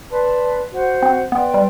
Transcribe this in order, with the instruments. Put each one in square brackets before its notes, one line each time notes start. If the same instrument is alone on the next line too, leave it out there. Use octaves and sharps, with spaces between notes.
[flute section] B4 D5 A5 C6
F#4 C5 F#5
[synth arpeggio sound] C4
[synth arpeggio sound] B3 [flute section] B4 D5 G5 C6
[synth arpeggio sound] G3